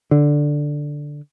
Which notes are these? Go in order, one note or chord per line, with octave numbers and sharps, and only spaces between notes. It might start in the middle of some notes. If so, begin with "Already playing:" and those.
D3